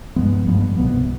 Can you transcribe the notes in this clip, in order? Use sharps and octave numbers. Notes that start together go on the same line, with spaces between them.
G2 F3 G#3 B3
G2 F3 G#3 B3
C2 B2 B3